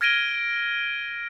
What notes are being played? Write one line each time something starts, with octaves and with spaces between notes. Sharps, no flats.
F6 G#6 A#6 D7 D#7 G7